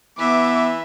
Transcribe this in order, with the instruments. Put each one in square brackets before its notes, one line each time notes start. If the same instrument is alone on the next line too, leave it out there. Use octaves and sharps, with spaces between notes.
[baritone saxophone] E3 [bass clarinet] B3 [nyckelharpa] E5 [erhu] D6